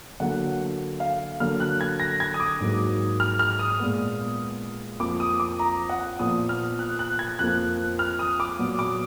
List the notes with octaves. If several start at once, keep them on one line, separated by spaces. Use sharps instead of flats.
D3 F#3 A#3 F#5
F5
D3 F#3 A#3 F6
F#6
G#6
A#6
G#6
D#6
D6
G#2 F#3 A#3
F6
F6
D#6
A#2 G#3 B3
F2 F3 A#3 D6
D#6
D6
A#5
F#5
A#2 F3 B3 D#6
F6
F#6
F#6
G#6
F2 F3 A#3 F#6
F6
D#6
D6
A#2 F#3 B3
D6